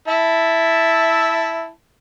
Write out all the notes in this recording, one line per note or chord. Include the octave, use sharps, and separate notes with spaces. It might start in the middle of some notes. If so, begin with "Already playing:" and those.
E4 E5 A5